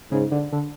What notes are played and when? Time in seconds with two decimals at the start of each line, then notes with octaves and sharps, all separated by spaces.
0.12 G#2 C#3
0.32 D3
0.52 D3